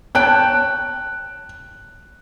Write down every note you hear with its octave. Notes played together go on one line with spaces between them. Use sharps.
C#5 G5 A5 F#6